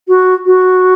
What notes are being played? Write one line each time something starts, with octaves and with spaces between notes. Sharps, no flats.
F#4
F#4